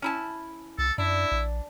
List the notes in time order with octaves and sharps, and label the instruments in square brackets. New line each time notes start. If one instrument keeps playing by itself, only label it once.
[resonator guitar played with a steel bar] C#4 E4 A5
[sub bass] C2 [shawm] A4
[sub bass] F#2 [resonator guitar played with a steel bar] D4 [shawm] E4
[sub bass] A#1